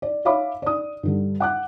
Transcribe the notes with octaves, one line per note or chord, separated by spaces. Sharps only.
D5
C#5 E5 F5 B5 D6
D5 D#6
G2 D3 G3
F#5 D6 F#6